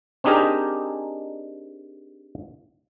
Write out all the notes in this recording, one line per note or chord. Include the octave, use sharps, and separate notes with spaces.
C4 D4 D#4 G4 G#4 A#4